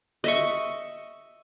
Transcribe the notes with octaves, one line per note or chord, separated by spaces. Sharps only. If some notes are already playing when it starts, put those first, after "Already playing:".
D#5 E5 C#6